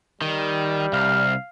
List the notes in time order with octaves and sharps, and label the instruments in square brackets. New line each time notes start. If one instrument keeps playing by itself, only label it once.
[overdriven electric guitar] D#3 [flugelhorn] G3
[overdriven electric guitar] C2 [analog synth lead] F5